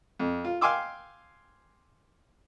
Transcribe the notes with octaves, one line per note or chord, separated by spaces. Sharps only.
F2
F4
F5 G5 G#5 C6 D6 E6